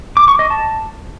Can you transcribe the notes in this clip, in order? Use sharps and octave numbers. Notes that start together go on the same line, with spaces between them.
D6
C#6
D#5
A5